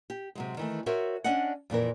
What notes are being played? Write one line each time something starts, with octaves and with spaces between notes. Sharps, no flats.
G4
C3 F#3 G#3
D#3 E3 A3
F#4 A#4 C5 C#5 E5
C#4 D4 D5 D#5 F#5
F2 A#2 E3 A#4